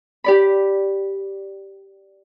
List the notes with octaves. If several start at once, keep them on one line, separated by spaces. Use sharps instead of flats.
G4 D5 B5